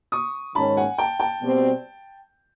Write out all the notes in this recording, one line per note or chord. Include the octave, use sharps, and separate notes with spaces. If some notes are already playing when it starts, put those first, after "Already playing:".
C#6 D#6
G#2 D#3 G#3 C#4 A5 B5
F#5 G#5
G5 A5
G5 A5
B2 G3 C4